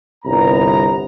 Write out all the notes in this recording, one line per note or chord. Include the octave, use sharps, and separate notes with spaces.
G1 C2 B3 A#5